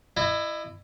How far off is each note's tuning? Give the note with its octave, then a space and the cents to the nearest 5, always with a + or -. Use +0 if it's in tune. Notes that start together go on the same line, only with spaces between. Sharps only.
E4 +10 D#5 -30